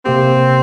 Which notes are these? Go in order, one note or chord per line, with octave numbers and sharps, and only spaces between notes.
C3 A#3 C4 G4